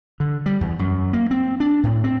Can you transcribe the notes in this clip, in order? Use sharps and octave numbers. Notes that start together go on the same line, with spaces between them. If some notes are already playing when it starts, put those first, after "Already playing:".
D3
G3
E2
F#2
A#3
C4
D4
A2
C4